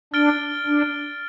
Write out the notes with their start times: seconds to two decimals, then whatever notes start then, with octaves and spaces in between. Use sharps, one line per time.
0.13 D4 F6 A6 D7 G7
0.66 D4